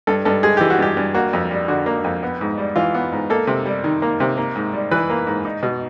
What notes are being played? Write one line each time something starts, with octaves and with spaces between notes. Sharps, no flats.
G2 A4
G2 A4
G#3 G#4
E3 G4
F#4
G2 G4
G2
A#3 F#4
F2
G3
D3 F#4
A#3
F2
B3
G#2
G3
E3 F4
B3
G#2
A#3 A4
C3
G3
D#3
A#3
C3
A#3
G#2
G3
E3 B4
A#3
G#2
D#4
B2